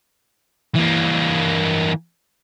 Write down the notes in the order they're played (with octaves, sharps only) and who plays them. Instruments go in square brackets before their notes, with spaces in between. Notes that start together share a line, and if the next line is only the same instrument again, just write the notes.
[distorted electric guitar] E3 A#3